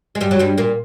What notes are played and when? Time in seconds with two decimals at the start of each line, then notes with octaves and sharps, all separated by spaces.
0.15 G#3
0.21 G2 G3
0.31 F#3
0.39 G2 G3
0.58 A#2 A#3